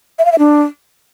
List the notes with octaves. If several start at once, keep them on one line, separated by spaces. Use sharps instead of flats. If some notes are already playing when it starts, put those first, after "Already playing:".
E5
F5
E5
D4